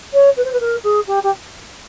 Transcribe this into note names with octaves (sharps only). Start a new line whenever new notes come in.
C#5
B4
C5
B4
A#4
G#4
G4
G4